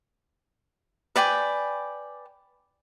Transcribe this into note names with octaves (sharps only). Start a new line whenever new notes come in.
B4 D5 G5 G#5